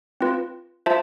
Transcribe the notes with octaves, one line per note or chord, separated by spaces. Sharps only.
C4 F4 B4
F4 C5 E5 A5